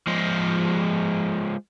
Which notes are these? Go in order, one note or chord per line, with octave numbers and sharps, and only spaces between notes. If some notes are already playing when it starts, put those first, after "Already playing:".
F3 G#3